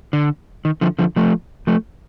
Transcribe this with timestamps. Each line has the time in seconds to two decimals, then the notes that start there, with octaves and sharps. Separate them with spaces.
0.13 D3
0.65 D#3
0.81 D3 F3
0.99 D3 F3
1.16 F3 A3
1.67 F3 A3